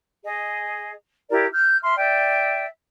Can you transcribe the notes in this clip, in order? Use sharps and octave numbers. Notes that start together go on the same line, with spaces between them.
G#4 D#5
E4 G4 A#4 D5
F6 G6
E5 C6 F6
D5 E5 G5